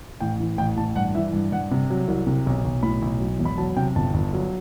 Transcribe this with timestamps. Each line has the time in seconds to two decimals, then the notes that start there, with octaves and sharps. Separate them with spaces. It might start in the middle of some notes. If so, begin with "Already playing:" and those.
0.20 A1 G5
0.40 E3
0.58 A1 G5
0.77 A1 A5
0.95 G2 F#5
1.15 E3 E5
1.33 G2
1.52 G2 F#5
1.71 C3
1.90 F#3
2.08 C2
2.27 C3
2.46 B1
2.64 B1
2.83 A2 B5
3.02 B1
3.20 F#3
3.39 E1
3.45 B5
3.58 F#3 A5
3.77 C3 G5
3.96 G1 A5
4.14 G1
4.33 F#3